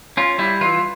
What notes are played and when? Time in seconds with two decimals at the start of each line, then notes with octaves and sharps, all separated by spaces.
0.17 C#4 F4
0.39 G3 E4
0.61 E3 F4